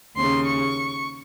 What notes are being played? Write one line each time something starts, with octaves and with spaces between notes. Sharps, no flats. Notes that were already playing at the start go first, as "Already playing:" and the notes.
D#2 C#3 C6
C#6